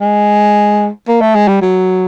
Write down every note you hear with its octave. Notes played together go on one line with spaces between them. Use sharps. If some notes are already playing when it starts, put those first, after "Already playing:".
G#3
A#3
A3
G#3
G3
F#3